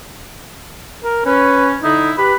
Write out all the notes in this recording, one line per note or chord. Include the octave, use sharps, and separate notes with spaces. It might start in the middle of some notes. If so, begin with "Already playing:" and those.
A#4
C#4 B4
D3 D#4 E4
G4 B4 B5